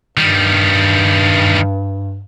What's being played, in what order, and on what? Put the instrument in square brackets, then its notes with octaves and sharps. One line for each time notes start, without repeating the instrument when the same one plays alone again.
[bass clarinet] G2 [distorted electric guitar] D#3 G3